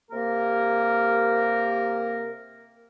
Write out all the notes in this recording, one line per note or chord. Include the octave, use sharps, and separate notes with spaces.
C3 A#3 G4 A#4